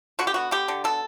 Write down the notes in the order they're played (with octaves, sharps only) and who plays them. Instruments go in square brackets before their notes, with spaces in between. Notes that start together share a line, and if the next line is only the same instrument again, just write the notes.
[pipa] D3 F#4
G4
B3 F#4
D3 G4
D3
B2 A4